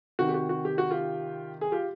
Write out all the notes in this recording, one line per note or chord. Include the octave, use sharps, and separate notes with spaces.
C3 D#3 F#4
G4
F#4
F#4
G4
F#4
F4 G4
G#4
F4 G4